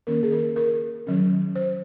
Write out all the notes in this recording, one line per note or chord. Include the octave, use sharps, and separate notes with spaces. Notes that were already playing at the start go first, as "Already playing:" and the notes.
D#3 A#3 C#4 A#4
G#4
A#4
A#4
D#3 F#3 C#4
C5